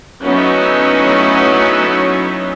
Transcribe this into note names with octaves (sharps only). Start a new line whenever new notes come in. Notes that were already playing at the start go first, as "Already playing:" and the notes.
F#3 A3 B3 C#4 D#4 E4